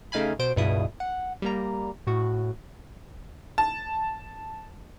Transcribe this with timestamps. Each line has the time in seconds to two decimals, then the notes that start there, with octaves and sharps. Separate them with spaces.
0.12 C#3 A3 D#4 F5 G#5 B5
0.39 B2 C5 D7
0.56 C#2 G2 B2 E4 D#6
1.00 F#5
1.42 G3 A#3 A#5
2.07 A2 F#4
3.58 A5